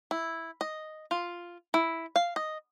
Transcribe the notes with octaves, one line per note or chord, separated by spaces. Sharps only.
E4
D#5
F4
E4
F5
D#5